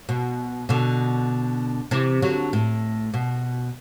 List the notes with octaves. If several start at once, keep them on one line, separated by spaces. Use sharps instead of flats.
B2
B2 D3
C3 E3
D3 F#3
A2
B2